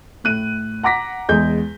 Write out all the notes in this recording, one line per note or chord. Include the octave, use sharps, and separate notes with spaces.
A2 F#6 D#7
F#5 A#5 D6 A#6 B6
E2 G#3 G6